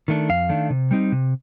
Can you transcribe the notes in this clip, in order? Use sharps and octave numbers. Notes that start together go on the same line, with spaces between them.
D#3 A3 D4
F2 F5
D#3 A3 D4
C3
G3 C4 D#4
C3